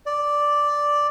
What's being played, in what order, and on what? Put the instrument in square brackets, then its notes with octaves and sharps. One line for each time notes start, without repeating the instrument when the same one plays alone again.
[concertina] D5